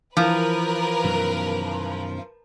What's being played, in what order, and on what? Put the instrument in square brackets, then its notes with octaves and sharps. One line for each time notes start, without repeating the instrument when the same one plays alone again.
[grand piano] E3 [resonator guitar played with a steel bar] F3 [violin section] A#4 B4
[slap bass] F#2 B2 D#3